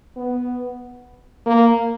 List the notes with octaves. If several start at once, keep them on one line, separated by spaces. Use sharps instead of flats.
B3
A#3